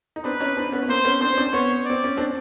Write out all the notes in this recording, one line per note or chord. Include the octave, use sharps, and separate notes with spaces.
D#4
C4 D4 B4
C#4 D#4
C4 D4
B3 C#4
C#4
A#3 C4 C5
B3 C#4
C4 D4 C5
C#4
C4 D4
B3 C#4 C#5
C4 D5
C#4
C4 D4